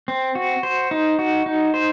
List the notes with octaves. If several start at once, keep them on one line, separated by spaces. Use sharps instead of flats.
C4
F#4
C5
D#4
F#4
D#4
C5